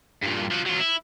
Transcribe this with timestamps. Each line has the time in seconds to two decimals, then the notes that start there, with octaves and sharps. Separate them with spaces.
0.23 G2 A#2
0.51 F3 F#4
0.66 F#3 F4
0.80 E4